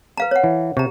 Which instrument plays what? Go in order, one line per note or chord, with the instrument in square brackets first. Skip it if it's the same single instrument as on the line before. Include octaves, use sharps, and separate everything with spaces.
[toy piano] B4 F5 A#5
C#5 F#5
[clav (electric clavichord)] E3
[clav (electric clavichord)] C3 [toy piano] G4 A#5